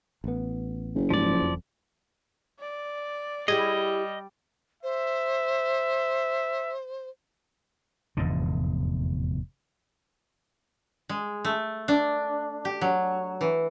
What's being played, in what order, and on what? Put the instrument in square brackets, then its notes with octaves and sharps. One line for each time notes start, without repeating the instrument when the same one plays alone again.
[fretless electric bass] A1 B3
[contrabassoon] F#1
[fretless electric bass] G#2 G3 [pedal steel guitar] F3 D5
[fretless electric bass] F2
[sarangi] D5
[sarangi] G3 [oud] E4 G4 G#4 [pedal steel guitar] D#5
[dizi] C5 [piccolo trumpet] E5
[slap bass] F1 E2 G#2 D3
[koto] G#3
A3
D4
G4
F#3
E3